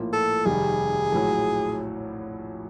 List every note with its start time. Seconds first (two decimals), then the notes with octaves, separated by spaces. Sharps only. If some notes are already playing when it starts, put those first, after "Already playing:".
Already playing: A#1 A2 F3 A#3
0.13 A4
0.45 F1 D#2 D#3 G3 G#4
1.12 A#1 A2 F#3